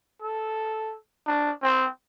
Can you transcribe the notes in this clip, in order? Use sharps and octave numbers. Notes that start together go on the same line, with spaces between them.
A4
D4
C4